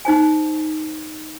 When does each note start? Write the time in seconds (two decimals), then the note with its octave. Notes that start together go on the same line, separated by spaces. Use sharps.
0.05 D#4 C5 G#5